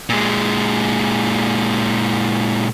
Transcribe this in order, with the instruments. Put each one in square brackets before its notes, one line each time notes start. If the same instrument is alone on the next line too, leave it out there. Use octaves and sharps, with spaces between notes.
[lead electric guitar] A#2 G#3